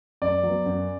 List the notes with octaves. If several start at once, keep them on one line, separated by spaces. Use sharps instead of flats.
F#2 D5
F#3 B3
F#2